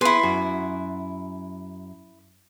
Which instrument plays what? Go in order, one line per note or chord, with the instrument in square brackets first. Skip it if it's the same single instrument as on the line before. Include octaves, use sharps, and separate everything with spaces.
[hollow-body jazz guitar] B3 G#4 B4 [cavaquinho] E4 C6
[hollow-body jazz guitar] F#2 F#4